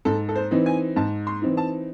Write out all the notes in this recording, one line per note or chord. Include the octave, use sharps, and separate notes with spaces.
G#2 A4
A4
C5
E3 C4 D#4
G#5
G#2 A5
C6
E3 C4 D#4
A5